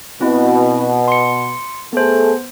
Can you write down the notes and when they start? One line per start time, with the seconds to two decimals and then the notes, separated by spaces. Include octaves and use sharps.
0.21 B2 C4 E4
1.08 C6 C#7
1.93 A3 B3 G#4 A4 C5